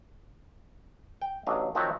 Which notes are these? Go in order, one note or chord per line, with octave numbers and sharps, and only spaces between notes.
G5
A1 F#3 D4 D#5 F5
D#3 F3 F#3 C4 F#4 E5